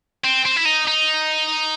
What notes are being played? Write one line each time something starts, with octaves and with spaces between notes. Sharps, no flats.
C4
C4
E4
D#4
D#4